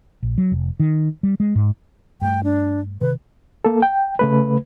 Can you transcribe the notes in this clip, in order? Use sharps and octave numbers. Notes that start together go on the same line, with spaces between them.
A#1
F#3
F1
D#3
G3
G#3
G#2
G2 A3 G5
D4
C3 D#3 B4
A#3 A4
G5
C#3 A3 B4